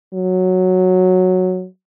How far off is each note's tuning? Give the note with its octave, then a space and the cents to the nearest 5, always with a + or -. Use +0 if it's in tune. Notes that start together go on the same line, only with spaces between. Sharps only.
F#3 -5